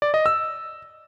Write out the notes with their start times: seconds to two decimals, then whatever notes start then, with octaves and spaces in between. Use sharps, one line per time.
0.02 D5
0.14 D#5
0.26 E6